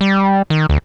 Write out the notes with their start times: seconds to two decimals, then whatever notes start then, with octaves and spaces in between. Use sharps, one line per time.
0.01 G3
0.50 D#3
0.69 D2